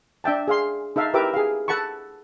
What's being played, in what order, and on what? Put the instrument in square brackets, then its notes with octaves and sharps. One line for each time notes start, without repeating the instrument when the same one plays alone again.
[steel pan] D4 E5 G5 A5
G#4 F5 C6
D#4 A4 E5 F5
E4 G4 A#4 B4 E5 D6
G#4 F5
A4 F#5 A5 B5 C#6